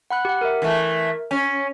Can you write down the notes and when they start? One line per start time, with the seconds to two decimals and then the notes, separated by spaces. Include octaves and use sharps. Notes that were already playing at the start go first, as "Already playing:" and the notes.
0.10 F#5 B5 F#6
0.25 G4 F#5
0.41 A#4 E5
0.62 E3 A3
1.31 C#4 G#5